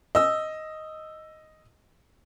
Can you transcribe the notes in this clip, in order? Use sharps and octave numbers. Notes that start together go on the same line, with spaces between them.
D#5 E6